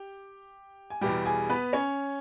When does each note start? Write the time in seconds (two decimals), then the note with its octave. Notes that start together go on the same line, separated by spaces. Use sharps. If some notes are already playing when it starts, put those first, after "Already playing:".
Already playing: G4 G5
0.90 G#5
1.01 E2 B2 G3 G4 G5
1.26 G#4 G#5
1.49 B3 B4
1.73 C#4 C#5